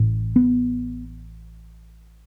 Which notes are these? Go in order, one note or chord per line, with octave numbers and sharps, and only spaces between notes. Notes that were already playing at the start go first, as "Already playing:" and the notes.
Already playing: A1 A2
B3